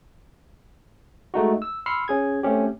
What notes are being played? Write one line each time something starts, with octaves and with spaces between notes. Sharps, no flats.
G#3 A3 D#4 F#4
E6
B5 C6 E6 F6 C7 C#7
C#4 G#4 G#6
A3 C4 C#4 G4